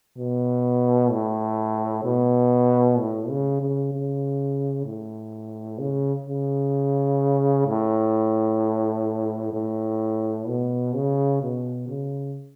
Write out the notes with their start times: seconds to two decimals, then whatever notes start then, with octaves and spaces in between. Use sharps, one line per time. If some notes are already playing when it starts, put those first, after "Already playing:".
0.18 B2
1.11 A2
2.04 B2
2.99 A2
3.29 C#3
3.61 C#3
3.93 C#3
4.86 A2
5.79 C#3
6.27 C#3
7.67 A2
9.53 A2
10.47 B2
10.94 C#3
11.42 B2
11.88 C#3